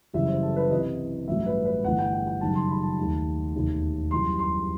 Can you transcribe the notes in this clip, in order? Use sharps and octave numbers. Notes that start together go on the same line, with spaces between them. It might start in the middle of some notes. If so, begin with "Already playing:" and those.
F#1 F#2 E3 G3 E5
C5
A4
B4
C2 C3 E3 D#5
A1 G2 F#3 A3 E5
B4
B4
G1 G2 E3 A3 F#5
G5
G5
G5
F#1 F#2 D#3 G3 A5
C6
B5
A5
D#2 D#3 A3
E1 D#2 D#3 A3
F#2 E3 G3 C6
C6